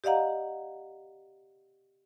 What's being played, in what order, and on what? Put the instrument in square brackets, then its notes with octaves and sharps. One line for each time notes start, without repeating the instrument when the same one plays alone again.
[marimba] G4 D5 D#5 F5 F#5 A#5